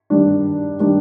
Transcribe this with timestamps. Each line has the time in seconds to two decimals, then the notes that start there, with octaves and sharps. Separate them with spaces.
0.10 D#3 G3 D4
0.80 D#3 G3 D4